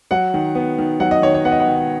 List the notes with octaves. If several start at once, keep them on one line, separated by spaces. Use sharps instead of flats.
F#3 F#5
D#3
B3
D#3
F#3 F#5
D#5
D#3 C#5
C#5
B3 F#5
D#5
F#5
D#3